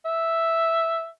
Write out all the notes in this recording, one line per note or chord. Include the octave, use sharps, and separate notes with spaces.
E5